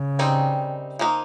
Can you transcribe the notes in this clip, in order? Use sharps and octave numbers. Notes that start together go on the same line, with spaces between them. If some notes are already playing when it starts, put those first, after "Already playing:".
Already playing: C#3
D#3 G3 C4 D#4
F3 A#3 D#4